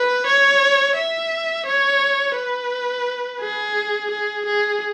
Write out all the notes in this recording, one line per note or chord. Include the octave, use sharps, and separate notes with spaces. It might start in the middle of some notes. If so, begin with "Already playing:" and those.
Already playing: B4
C#5
E5
C#5
B4
G#4
G#4
G#4